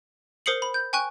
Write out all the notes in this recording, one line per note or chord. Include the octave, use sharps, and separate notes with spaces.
A#4 C5 D#6 C7 C#7 F#7
B5
G6
G5 G#5 C#6 F#6